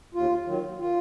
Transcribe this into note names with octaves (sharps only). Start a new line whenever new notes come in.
D#2 F4
D#3 F#3
F4